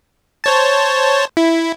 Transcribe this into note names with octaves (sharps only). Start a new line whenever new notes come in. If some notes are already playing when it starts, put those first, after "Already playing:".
C5 C#5 A5
E4